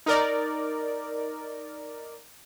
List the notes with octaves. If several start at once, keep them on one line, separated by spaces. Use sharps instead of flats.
D#4 A#4 D5